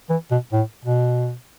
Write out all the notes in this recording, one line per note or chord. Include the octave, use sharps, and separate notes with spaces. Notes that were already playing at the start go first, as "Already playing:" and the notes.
E3
B2
A2
B2